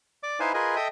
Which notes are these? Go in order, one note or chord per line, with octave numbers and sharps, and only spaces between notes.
D5 D6
D#4 E4 B4 C5 F5 G#5
F4 G#4 A#4 B4 D#5 G#5
A4 D#5 E5 G5 D#6